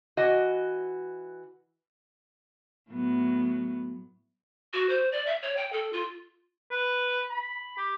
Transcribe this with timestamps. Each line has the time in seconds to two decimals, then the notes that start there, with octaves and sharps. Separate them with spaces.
0.17 E3 F#4 D#5
2.91 A2 F#3 B3
4.73 F#4
4.89 C5
5.12 D5
5.27 E5
5.43 C#5
5.57 G5
5.72 A4
5.93 F4
6.71 B4
7.30 B5
7.77 G4